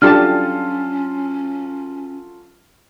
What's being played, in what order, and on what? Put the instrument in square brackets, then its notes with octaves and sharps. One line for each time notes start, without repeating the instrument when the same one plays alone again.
[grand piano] F#3 F4 A4 [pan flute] C#4 [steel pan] D4 G4 A5 [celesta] F6